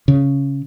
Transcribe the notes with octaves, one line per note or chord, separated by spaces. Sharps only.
C#3